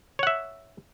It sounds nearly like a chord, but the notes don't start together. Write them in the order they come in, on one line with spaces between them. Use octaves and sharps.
C#5 F#5 E5